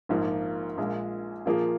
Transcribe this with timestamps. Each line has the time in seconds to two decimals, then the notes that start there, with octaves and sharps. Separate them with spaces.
0.09 A#1 G#2 F3 A#3 F4
0.77 A#1 A#2 G#3
1.46 A#2 F3 A#3 F4 G#4